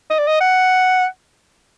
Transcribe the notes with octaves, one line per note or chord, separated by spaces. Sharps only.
D#5
D5
D#5
F#5